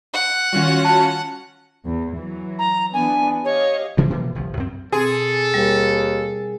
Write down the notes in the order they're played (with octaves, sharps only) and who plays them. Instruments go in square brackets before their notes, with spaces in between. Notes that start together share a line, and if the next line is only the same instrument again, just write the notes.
[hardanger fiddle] F#5
[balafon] D#3 G3 [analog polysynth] C#4 F4 F#4
[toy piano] A5
[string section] E2
E3 F#3
[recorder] A#5
[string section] E3 B3 D4 [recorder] G#5
[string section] G4 D#5 F5 [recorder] C#5
[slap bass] G2 C#3 E3 F3
B2 E3 A#3
G1 C2 F3
F#2 C4
[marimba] B2 C4 [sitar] G#4 [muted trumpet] A4
[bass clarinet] D#2 [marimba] G3 A#4